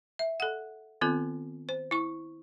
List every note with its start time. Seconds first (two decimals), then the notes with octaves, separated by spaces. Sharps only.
0.19 E5
0.40 A4 F#5
1.01 D#3 B3 C4 F4 A4
1.69 C5
1.91 E4 C#6